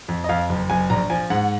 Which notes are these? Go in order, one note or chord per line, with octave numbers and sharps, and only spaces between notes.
F2
D#5
F2 F5
F#1
F#1 G#5
A#1 A#5
F3 G#5
G#2 F#5